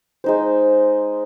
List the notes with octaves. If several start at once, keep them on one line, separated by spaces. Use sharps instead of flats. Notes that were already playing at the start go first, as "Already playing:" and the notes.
G#3 D#4 C5